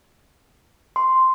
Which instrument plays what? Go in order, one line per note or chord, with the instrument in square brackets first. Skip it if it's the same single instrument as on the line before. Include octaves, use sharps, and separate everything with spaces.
[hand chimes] C6